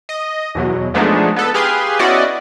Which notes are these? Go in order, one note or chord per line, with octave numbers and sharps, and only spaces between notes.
D#5
E2 B2 F#3
F3 G#3 A3 B3 D4 D#4
B3 A4
G4 G#4 B4 F5 C6
B3 C#4 E4 F#4 D5 D#5